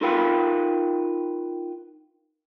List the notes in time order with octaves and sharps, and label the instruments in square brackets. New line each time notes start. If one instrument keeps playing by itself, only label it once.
[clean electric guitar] D#4 F4 A#4 B4 F5 G5